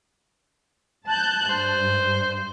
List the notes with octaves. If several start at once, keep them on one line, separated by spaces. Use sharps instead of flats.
A5 F#6 G6
G2 C5